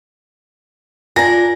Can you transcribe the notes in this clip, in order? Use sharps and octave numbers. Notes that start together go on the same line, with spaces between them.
D4 F4 A#4 G#5 A#6